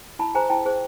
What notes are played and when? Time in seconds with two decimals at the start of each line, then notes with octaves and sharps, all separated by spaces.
0.19 E4 A5 B5
0.35 G#4 C5 G#5 A#5
0.50 E4 G5 A5
0.66 G#4 C5